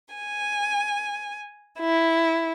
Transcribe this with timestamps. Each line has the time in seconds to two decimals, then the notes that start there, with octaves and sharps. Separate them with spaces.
0.14 G#5
1.80 E4